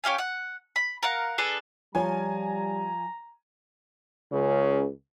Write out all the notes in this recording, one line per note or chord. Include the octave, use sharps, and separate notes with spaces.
C#4 G4 F5 G#5
F#5
B5
A#4 F5 F#5
D4 G#4 A4 B4
F3 G3 F4 C#5 G#5 A#5
C#2 C#3